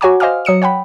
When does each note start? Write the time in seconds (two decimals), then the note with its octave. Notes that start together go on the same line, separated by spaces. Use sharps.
0.01 F#4 C#5 F#5 G#5 A#5 D6
0.20 C5 D#5 F5 G#5 D6 F6
0.45 F#3 D#6 C#7 E7
0.62 C#5 F#5 G5 B5